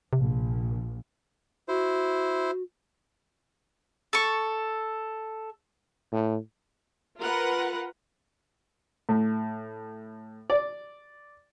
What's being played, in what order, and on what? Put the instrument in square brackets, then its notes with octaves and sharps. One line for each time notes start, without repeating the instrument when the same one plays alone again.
[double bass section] A#1 F3 [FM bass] C3
[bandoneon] E4 C5 [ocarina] F#4
[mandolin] A4 C#6
[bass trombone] A2
[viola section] F4 A#4 B4 F#5
[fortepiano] A2
D5